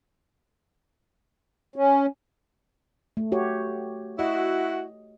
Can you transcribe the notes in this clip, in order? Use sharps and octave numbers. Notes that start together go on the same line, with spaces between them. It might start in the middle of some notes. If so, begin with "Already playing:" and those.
C#4
A3
F#4 G4 C#5
E4 F#4 D#5